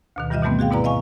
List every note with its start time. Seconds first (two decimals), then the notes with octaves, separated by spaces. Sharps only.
0.16 D2 B2 D#3
0.30 G2 E3 G3 F4 D#5 E5
0.42 B2 E3 G3 A3 B3 C4
0.59 F#4 G#4 F5 G5
0.71 G#2 B2 E4 B4 D5 A#5
0.84 D#5 F5 G#5 C#6